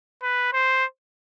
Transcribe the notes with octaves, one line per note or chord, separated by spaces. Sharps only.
B4
C5